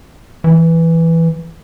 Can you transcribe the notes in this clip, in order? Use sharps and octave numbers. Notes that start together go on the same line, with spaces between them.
E3